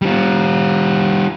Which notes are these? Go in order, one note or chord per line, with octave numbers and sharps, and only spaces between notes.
G3 F4